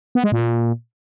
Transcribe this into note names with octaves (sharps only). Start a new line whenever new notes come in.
B3
G#3
A#2